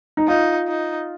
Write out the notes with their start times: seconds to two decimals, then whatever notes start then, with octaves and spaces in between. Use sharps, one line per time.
0.17 D#4
0.28 D#4 F4
0.68 D#4